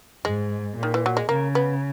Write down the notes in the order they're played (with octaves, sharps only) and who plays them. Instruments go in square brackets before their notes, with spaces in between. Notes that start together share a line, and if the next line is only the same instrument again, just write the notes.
[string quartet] G#2 [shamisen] G#3
[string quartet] A#2
[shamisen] D#3
E3
F#3
G#3
[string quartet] C#3 [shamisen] A#3
[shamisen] B3